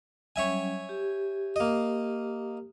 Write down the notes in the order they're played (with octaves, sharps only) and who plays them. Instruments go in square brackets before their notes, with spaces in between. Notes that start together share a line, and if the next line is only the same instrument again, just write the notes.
[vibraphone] F#3 G3 C#4 [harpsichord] C#5 E5 G#5
[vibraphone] G4
[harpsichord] A#3 D#5